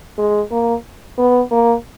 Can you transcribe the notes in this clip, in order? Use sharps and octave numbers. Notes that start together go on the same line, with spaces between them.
G#3
A#3
B3
A#3